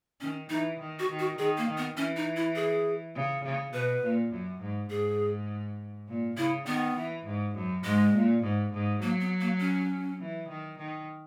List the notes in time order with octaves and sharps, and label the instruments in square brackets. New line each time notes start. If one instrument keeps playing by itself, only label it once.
[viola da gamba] D#3 [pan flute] C#4
[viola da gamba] E3 [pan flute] D#4
[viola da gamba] D#3
[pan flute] F#4
[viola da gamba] D#3
[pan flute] F#4
[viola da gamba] D#3 [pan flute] G#4
[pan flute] A#3
[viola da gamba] D#3
[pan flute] B3
[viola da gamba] E3 [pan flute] C#4
[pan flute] D#4
E4
G#4
[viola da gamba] C#3
C#3
[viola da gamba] B2 [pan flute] B4
[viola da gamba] A#2
F#2
G#2
[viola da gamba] G#2 [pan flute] G#4
[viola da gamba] A#2
[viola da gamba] C#3 [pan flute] E4
[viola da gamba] D#3 [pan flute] B3
[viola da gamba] E3
G#2
F#2
[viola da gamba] G#2 [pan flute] G#3
[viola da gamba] A#2
G#2
G#2
[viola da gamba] F#3 [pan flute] A#3
[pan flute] B3
A#3
C#4
[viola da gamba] E3
D#3
D#3